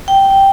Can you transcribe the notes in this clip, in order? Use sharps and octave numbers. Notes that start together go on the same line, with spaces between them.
G5